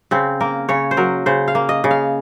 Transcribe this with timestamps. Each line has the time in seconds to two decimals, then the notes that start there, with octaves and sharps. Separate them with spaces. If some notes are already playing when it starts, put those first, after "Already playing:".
0.11 C#3 C4
0.40 A#3 A#4
0.69 C#3 C#5
0.91 C5
0.97 F#3 A#4
1.26 C#3 C5
1.48 F5
1.55 A#3
1.69 D#5
1.84 C#3
1.91 F5